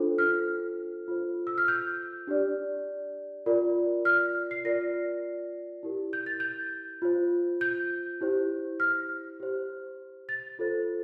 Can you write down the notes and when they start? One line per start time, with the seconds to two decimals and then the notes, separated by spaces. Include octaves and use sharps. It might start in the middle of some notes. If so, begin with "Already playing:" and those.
Already playing: D4 F4 A4 C5
0.18 F6
1.08 F4 A4 C5
1.47 E6
1.58 F6
1.68 G6
2.27 D4 G4 D5
3.46 F4 A#4 D5
4.05 F6
4.51 C7
4.65 F4 A#4 D5 A#6
5.83 E4 G4 A#4
6.13 G6
6.26 A6
6.40 G6
7.02 F4 C5
7.61 G6
8.21 E4 G4 C5
8.80 F6
9.40 G4 C5
10.29 A6
10.59 F4 A4 C5